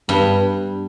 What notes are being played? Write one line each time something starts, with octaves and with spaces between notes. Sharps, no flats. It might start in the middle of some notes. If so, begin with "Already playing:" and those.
G2 G3 B3 D4 G4 B4